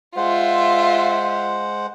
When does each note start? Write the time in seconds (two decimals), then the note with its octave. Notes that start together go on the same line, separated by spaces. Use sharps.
0.16 G#3 F4 C5 E5 F#5